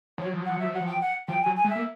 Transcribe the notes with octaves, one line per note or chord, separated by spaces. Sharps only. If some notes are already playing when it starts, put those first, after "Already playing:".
F3 C#5
F#3
F3
F#3
F3 F#5
F#3 E5
F3
F#3 F#5
F3
G5
F#5
F3 G5
F#3 G#5
G#5
G#3
E5
A#3